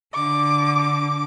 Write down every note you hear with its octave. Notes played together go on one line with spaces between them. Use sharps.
D3 D6